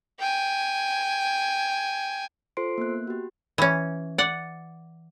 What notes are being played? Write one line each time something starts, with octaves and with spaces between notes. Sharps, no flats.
G5 G#5
F4 A4 C5 C6 C7 D7
A#3 B3 F#6
F#4 G4
E3 C#4
D5 F#5